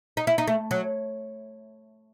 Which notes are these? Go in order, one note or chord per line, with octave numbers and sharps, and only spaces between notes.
D#4
E4
D#4
A3
F#3